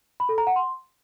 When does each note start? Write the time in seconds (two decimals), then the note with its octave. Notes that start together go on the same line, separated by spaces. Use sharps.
0.20 B5
0.29 A4
0.38 A#5
0.47 F#5
0.56 C6